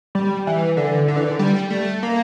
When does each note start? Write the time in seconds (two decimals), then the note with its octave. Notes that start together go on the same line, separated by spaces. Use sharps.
0.15 G3
0.47 E3
0.77 D3
1.08 D3
1.16 E3
1.24 D3
1.39 G3
1.70 A3
2.03 A#3